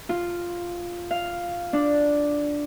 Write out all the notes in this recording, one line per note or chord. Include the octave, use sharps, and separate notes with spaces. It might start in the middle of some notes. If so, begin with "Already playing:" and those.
F4
F5
D4